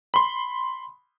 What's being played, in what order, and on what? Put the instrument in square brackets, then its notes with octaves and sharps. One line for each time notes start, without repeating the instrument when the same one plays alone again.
[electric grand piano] B5 C6